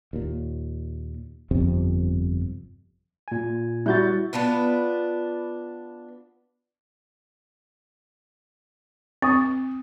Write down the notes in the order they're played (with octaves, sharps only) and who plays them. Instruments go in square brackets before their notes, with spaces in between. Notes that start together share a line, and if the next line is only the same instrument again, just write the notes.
[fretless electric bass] D#2 A#2
G1 F2 C3 F3
[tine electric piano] A#2 G#5
[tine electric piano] G3 G6 A6 [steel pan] E4 F#4
[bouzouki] B3 D4 F4 B4
[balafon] C4 [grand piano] C#6 D#6